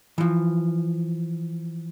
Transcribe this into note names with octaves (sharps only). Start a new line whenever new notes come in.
E3 F3